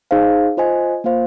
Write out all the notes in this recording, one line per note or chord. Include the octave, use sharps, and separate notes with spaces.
D#4 G#4 C5 F5
F4 C5 D#5 G#5
A#3 F4 C5 F5